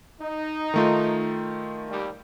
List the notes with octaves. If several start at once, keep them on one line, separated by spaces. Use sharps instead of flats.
D#4
D#3 A3 F4
D#2 G3